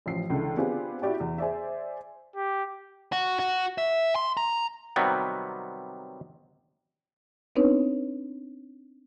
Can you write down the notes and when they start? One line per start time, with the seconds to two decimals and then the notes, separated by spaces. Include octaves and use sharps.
0.06 A1 F3 C7
0.30 C#2 D3 E3 A4
0.57 B3 C4 D4 F4 G4 G#4
1.02 E4 F#4 G4 D5 G5
1.20 E2
1.38 G#4 C5 D5 E5
2.36 G4
3.12 F#4
3.39 F#4
3.78 E5
4.15 C6
4.37 A#5
4.96 C3 D#3 F#3 G3 B3
7.56 B3 C4 D4 D#4 B4 C#5